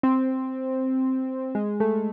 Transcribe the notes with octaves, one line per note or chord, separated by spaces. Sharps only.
C4
G#3
A3